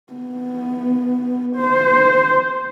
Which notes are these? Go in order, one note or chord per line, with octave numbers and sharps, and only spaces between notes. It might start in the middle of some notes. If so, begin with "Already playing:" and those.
B3
C5